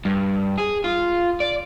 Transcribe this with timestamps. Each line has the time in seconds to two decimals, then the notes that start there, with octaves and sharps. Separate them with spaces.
0.05 G2
0.58 G#4
0.84 F4
1.40 D5